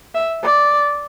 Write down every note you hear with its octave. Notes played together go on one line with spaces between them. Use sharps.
E5
D5